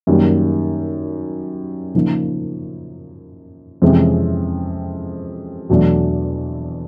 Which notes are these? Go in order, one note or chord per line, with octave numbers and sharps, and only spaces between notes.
F#2 D#3 G3 A#3
C#3 F3 A#3 D#4
F2 C3 E3 G#3 C#4
E2 B2 F#3 A3 D4